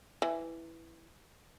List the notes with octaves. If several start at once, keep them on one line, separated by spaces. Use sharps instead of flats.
E3